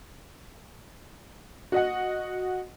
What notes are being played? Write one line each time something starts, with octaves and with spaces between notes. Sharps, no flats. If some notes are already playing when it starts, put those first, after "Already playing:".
F#4 D#5 F#5